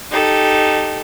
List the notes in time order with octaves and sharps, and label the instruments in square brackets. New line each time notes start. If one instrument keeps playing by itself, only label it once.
[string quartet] D#4 G4 A4